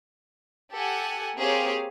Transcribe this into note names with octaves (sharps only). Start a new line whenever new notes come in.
G4 A4 F#5 G#5
A#3 C4 G4 G#4 C#5 F5